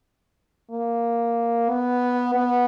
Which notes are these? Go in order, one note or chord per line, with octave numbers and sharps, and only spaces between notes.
A#3
B3
B3